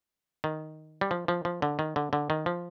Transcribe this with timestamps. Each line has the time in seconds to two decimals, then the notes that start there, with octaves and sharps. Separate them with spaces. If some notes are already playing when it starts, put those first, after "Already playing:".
0.44 D#3
1.01 G3
1.11 F3
1.28 F3
1.45 F3
1.62 D3
1.79 D#3
1.96 D3
2.13 D3
2.30 D#3
2.46 F3